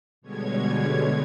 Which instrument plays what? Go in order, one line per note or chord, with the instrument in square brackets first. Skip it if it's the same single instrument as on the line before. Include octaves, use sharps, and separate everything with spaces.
[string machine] B2 D3 G3 G#3 C#5 G#6